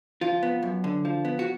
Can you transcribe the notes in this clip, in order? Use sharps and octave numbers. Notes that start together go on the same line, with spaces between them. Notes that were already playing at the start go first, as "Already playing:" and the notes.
F3 F4
B3
F#2
D3
F3
B3
F#4